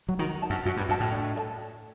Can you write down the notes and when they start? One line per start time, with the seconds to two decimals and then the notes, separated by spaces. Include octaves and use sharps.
0.09 F#3
0.19 D#3 F#4
0.42 C5 D#5 A5
0.50 F#2
0.65 F#2 F#4
0.77 G2
0.89 F#2 C5 D#5 A5
1.00 A2
1.12 D4
1.35 A4 D#5 A5